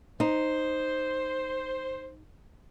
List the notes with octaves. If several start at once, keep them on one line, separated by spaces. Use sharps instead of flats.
D#4 C5